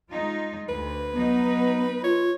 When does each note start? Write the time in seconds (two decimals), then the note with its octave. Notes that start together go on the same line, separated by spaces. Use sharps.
0.12 G#3 D#4 F4
0.69 D2 B4
1.14 F#3 B3 D#4
2.04 F4 C#5